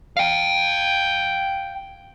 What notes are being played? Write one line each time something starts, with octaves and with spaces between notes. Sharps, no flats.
F5 G5